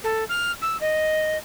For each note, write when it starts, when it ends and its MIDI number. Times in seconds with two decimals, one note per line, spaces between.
0.04 0.24 69
0.29 0.52 89
0.62 0.79 88
0.81 1.38 75